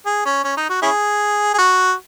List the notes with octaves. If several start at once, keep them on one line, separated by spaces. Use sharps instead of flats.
G#4
C#4
C#4
D#4
F#4
C#4 E4 G#4
G#4
F#4